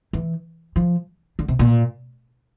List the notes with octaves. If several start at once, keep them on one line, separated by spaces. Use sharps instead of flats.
E3
F3
D3
C3
A#2